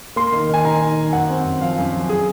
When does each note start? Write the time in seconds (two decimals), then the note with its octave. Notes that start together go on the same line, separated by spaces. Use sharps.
0.16 A#3 C6
0.32 D#3
0.49 D#3 G#5
0.65 D#3 A#5
0.81 D#3
0.97 D#3
1.13 F#2 F#5
1.30 C4
1.45 F#2
1.61 F3 F5
1.77 F#2
1.93 F3
2.09 G#4